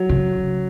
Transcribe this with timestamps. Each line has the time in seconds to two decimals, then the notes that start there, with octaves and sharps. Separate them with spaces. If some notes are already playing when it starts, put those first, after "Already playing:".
Already playing: F#3
0.09 C#3